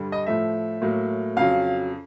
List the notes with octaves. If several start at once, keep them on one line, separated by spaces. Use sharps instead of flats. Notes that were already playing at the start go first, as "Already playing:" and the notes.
Already playing: G2 D3 G3
D#5
A2 F3 A3 E5
A2 F#3 A#3
F2 C#3 F#3 F5